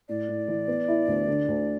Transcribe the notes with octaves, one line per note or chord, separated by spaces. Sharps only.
A2 D5
A2
E3
B3
E4
D2
D3
D2